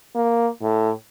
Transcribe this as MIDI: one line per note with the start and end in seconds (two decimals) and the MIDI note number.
0.15 0.48 58
0.62 0.90 45